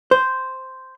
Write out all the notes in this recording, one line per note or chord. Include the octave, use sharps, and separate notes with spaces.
C5